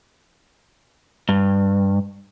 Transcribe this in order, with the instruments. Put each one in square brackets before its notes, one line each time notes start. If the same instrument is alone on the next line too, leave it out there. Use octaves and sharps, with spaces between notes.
[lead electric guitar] G2